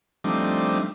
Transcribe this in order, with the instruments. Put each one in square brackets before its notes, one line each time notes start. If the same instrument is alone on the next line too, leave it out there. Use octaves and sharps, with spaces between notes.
[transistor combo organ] F3 G3 A3 C4 D4 D#4